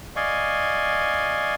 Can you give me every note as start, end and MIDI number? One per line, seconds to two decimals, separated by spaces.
0.16 1.55 74
0.16 1.55 75
0.16 1.55 77
0.16 1.55 80
0.16 1.55 85